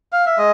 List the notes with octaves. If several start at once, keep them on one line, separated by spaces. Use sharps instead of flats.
F5
E5
G#3 D#5